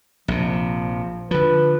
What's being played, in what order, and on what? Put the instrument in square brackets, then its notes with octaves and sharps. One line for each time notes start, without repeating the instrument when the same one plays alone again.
[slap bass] A#1 C3 [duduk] F3
[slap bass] D3 F3 [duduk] B4